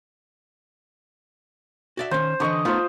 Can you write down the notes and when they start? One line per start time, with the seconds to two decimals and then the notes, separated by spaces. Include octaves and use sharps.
1.97 F#4 D5 E5
2.11 D#3 C#4 C5
2.40 D3 E3 D#5 C#6 D#6
2.65 A3 B3 D#4 F4 C5